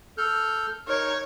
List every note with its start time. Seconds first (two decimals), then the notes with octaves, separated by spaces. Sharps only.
0.18 A4 F6 G6
0.88 D#4 A#4 C#5